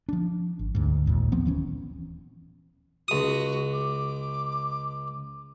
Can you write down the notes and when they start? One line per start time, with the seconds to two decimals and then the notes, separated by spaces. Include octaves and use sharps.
0.09 F3 D4
0.59 G#1
0.75 D2 G#2
1.06 A1 D#2 A#2
1.32 F3 B3 C4
1.45 D1 E3 C#4
3.08 C#2 F#4 D#6
3.73 D6